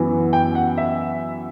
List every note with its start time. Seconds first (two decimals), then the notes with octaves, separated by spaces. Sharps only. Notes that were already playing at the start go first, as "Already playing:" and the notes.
Already playing: F#2 E3 B3
0.33 G5
0.55 F#5
0.78 E5